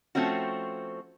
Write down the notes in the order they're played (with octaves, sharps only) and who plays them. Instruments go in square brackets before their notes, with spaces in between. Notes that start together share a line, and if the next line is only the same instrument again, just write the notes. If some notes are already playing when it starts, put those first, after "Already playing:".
[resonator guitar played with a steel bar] F3 A3 C4 C#4 F#4